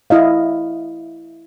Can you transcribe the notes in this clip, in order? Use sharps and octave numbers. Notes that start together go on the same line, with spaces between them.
E4 D#5 F5